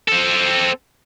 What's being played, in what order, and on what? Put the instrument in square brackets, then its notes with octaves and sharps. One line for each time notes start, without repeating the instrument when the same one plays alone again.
[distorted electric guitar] C4 A4